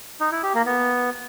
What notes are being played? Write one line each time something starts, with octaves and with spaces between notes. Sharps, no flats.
D#4
E4
G4
A#3
B3